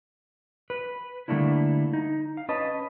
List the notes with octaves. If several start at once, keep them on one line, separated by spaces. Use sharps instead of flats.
B4
D3 G3 A3 A#3 D4 E4
D#4
F5
C#4 B4 D#5 A5